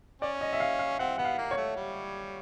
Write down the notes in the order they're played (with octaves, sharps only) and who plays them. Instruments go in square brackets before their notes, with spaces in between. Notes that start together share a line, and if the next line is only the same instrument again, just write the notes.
[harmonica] C#4 [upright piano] D5
[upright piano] D#5
E5
F5
F5
[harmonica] C4 [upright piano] F#5
[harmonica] B3 [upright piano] F#5
[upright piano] F5
[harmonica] A#3
[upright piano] C#5
[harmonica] A3
G3